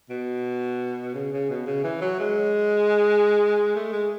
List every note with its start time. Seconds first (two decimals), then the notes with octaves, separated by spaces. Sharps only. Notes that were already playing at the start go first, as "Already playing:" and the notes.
0.10 B2
1.15 C#3
1.33 C#3
1.50 B2
1.66 C#3
1.84 E3
2.01 F#3
2.19 G#3
3.76 A3
3.93 G#3